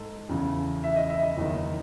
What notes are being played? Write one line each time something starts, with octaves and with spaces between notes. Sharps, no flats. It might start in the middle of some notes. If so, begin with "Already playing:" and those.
Already playing: G#2 A4
E2 C#3 E3
E5
D#5
E5
D#5
F#1 E2 D#3